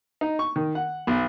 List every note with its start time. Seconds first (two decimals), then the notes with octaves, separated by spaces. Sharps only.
0.21 D#4
0.39 C#6
0.56 D#3
0.75 F#5
1.07 B1